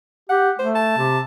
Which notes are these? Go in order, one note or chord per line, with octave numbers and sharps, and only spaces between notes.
G4 F#5
A3 C5
A5
C3